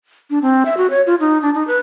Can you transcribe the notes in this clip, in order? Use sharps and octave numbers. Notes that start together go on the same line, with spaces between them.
D4
C4
E5
F#4
C#5
F4
D#4
D4
D#4
B4